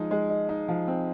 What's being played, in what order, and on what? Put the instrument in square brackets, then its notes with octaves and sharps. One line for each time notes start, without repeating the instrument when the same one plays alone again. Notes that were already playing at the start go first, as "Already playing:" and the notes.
Already playing: [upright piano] F3 G#3 D#4
G#3
D#4
D#4
F3
C4